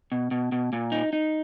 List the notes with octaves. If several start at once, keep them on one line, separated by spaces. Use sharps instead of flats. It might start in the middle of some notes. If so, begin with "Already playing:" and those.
B2
B2
B2
A#2
D#4
D#4